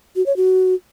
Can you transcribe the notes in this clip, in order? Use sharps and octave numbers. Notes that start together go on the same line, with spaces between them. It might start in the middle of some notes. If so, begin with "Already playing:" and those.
F#4
C#5
F#4